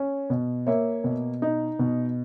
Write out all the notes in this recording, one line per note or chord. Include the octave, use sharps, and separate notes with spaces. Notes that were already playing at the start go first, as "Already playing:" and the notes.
Already playing: C#4
B2
A#3 C#5 E5
B2
D#4
B2